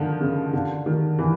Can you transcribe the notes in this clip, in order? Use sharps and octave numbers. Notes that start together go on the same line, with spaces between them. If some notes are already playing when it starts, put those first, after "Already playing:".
Already playing: D3 D#3 F3
C#3
D3
D#3
E3